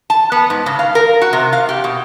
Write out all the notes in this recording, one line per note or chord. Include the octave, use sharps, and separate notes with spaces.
A5
B3
G#2
C#3
F5
A#4
F#4
C3
F5
G4
B2